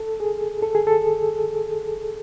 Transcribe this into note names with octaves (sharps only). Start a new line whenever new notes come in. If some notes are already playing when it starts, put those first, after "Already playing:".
Already playing: A4
G#4
A4
G#4
A4